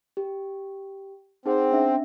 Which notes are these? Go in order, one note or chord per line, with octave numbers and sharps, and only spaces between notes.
G4
C4 D#4 G#4 F#5
C#4 D4 E5